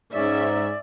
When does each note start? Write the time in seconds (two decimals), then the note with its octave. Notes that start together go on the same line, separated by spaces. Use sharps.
0.13 G#2 C#4 D5 E5